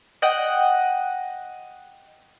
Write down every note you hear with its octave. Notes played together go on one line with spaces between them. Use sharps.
D#5 F#5 G5